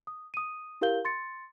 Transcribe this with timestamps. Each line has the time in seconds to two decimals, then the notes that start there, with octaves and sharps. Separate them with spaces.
0.07 D#6
0.34 D#6 D#7
0.81 E4 G4 A#4 F5 G6 G7
1.05 C6 A6 C#7